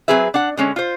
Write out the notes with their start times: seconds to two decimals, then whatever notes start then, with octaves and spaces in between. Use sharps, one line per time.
0.08 F#3 A3 C4 G#4 B4 E5
0.34 D4 F#5
0.57 D3 G#3 C#4
0.76 F4 C5